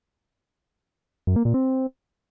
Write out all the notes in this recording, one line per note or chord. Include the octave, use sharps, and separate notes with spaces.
F#2
A#3
A#2
C4